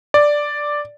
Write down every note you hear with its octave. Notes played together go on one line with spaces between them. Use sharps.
D5